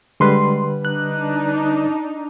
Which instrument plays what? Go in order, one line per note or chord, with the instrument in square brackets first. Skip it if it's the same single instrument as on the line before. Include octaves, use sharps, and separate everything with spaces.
[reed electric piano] D3 G3 B4 [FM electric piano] G#3 C6
[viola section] D4 D#4 [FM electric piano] F#6